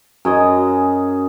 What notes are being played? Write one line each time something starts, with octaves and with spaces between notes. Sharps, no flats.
F#2 G#4 D#5